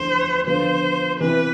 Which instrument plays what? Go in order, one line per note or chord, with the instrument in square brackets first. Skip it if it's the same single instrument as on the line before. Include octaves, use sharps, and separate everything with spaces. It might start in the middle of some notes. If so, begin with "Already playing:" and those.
Already playing: [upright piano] E2 D3 F3 A3 D4 [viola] C5
[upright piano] D3 F3 B3 [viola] C5
[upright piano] C3 E3 B3 [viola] B4